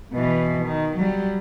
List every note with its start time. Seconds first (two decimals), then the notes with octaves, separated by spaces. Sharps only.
0.13 B2 E3
0.63 D#3
0.97 F#3 G3